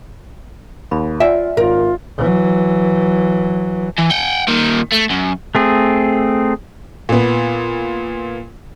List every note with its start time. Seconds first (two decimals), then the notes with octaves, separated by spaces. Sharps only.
0.91 D#2 B5
1.20 F4 D5 E5 F#5 G#5
1.57 G#1 F4 A#4
2.18 E3 F#3
3.99 E3
4.11 F#5 G5
4.48 A#2 D#3
4.93 A3
5.11 F#2
5.55 A3 C4 G#4
7.09 A#2 B3